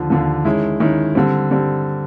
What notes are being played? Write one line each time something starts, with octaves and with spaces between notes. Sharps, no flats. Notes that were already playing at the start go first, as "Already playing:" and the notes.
Already playing: D#2 D3 F3
D#2 D3 F3
D#3 G#3 C#4 E4
D#3 G#3 C#4 E4
D3 G3 C4
D3 G3 C4